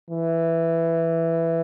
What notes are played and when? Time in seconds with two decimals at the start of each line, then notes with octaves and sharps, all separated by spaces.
0.10 E3